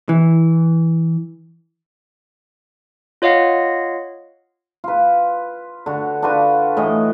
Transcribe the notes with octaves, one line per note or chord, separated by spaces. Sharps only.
E3
F4 C#5 D#5 F5 F#5
F4 B4
D3 F#4
D4 F4 F#4 B4
A2 E3 D#5 G#5